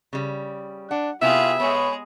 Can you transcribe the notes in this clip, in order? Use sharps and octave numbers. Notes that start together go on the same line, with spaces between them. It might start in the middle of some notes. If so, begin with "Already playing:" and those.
C#3 G3
D4 F#5
C3 B3 E4 F4 G4 G#4 E5
G#3 B3 G#4 C#5 B5